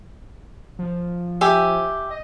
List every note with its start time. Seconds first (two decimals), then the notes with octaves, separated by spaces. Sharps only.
0.79 F3
1.41 G4 E5 G#5
2.10 D#5